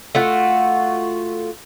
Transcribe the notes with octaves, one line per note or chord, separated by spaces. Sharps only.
A3 F4 F#4